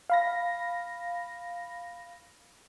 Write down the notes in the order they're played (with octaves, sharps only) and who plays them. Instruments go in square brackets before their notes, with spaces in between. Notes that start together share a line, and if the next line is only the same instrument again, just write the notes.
[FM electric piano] F5 B5 A#6